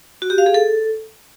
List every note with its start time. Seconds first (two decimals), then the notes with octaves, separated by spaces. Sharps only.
0.22 F#4
0.30 G4
0.38 F5
0.46 G#4
0.54 A4